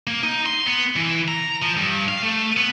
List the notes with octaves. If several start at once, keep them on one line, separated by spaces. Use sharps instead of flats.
A#3
D#4
C6
B3
E3
A#5
F3
G2
F5
A3
B3